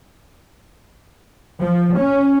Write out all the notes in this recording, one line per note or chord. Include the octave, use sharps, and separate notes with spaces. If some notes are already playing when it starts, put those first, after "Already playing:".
F3
C#4